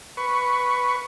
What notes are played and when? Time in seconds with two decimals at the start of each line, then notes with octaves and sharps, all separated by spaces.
0.17 B4 C#6